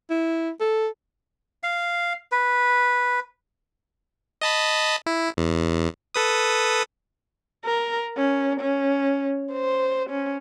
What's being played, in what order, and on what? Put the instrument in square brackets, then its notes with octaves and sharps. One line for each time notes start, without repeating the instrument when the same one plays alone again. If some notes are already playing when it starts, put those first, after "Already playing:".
[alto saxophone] E4
A4
[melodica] F5
B4
[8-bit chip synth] D#5 A5 B5
E4
E2
A4 B4 D#6
[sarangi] A#4
C#4
C#4
C5
C#4